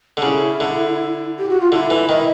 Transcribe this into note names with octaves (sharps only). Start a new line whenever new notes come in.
D3
C#3 E4
D3
G4
F#4
F4
D3 E4
E3
D#3